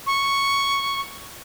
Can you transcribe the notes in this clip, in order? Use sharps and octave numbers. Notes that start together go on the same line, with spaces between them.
C#6